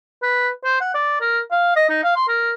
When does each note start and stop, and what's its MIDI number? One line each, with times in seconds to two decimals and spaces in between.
0.22 0.49 71
0.64 0.77 72
0.81 0.91 78
0.94 1.19 74
1.21 1.39 70
1.51 1.76 77
1.76 1.85 75
1.89 1.99 63
2.04 2.15 77
2.16 2.25 84
2.28 2.53 70